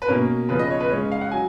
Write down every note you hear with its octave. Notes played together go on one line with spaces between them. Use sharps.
B4
B2 A#3 C#4 A#4
C#3 F3 B3 B4
D#5
C#5
B4
C#3 G#3 C#4 C#5
F5
F#5
F#3 G#5